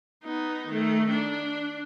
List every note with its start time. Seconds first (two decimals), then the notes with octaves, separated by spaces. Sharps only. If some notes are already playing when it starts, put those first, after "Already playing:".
0.24 B3 D#4
0.67 D#3 A3
1.10 D4